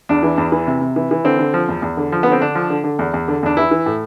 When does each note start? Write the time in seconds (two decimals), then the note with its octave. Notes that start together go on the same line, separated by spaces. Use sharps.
0.09 E2 D4
0.23 E3
0.38 E2
0.52 E3
0.67 C3
0.81 C3
0.96 E3
1.11 E3
1.24 D3 C4
1.39 D3
1.54 F3
1.69 E2
1.82 E2
1.97 D3
2.12 F3
2.23 D3 B3
2.32 C4
2.40 D3 D4
2.55 F3
2.70 D3
2.84 D3
2.99 E2
3.14 E2
3.28 D3
3.43 E2 D4
3.57 E3 E4
3.71 E3
3.86 A2